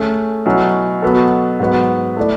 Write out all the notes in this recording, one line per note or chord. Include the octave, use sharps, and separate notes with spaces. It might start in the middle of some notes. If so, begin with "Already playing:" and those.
Already playing: A3 C#4 G#4
B2 F#3 C#4 E4
B2 F#3 B3 F#4 A4
G#2 F#3 B3 F#4
A3 E4 A4 D5